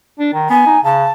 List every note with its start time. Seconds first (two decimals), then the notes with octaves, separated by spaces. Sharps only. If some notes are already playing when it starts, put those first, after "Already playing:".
0.19 D4
0.34 D#3
0.50 B3 G#5
0.66 D#4
0.84 C#3 A5